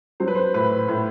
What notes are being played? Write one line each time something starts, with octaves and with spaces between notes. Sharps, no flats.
F#3 C5
B4
C5
A2 B4
A2